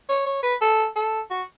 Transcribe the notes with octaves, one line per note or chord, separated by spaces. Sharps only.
C#5
C#5
B4
A4
A4
F#4